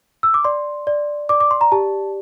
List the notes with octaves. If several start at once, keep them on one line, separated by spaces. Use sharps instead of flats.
E6
D6
D5 C6
D5
D5 D6
D6
C6
A#5
G4 A5